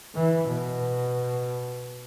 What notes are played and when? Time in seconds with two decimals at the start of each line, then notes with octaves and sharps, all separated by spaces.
0.15 E3
0.48 B2